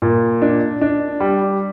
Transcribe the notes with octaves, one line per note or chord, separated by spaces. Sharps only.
A#2
D4
D4
G3